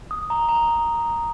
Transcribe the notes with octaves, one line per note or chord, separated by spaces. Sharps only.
D#6
A#5
A#5